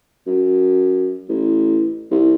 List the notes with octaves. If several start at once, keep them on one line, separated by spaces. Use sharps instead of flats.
F#2
A1
C2